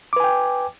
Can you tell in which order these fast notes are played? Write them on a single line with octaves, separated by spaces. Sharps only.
D6 B4 G#5 G5